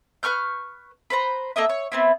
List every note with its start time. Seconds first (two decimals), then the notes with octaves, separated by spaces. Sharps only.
0.23 B4 C#6 F6 G6
1.10 B4 C5 A#5
1.56 A#3 A4 D#5 E5
1.69 C#5
1.92 B3 C4 E4